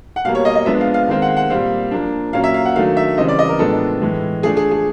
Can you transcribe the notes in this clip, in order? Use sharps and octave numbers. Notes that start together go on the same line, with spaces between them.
F#5
B2 G3 A#3 F5
C#5
D#5
D#5
F3 G#3 B3 D4 E5
F5
F5
D#3 G#3 C4 F5
F#5
F#5
A#2 G3 C4 F5
F3 A#3 D4
A#2 F#3 A#3 C#4 F5
E5
F5
F#5
D#3 F#3 A3 D4 F5
E5
C#3 E3 G3 C4 D#5
D5
D#5
A#4
A2 F3 G#3 B3 D4 A4
A2 E3 G#3
F3 A3 D4 G#4
G#4
G#4